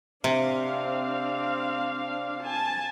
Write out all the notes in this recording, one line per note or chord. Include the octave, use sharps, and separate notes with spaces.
C3 C4 D4 F5
G#5 A5